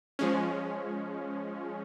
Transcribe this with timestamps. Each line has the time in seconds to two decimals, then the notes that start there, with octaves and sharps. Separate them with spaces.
0.19 F3 G#3 C#4